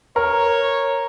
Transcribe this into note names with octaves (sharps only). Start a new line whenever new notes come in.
A#4 C#5